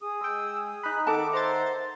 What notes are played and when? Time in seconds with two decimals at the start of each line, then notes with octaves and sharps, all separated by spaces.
0.02 G#4 D#6
0.21 G#3 G5 E6
0.83 D#4 B5 F#6
1.07 D#3 A4 E5 F#5 A5 D6
1.33 C5 A#5 A6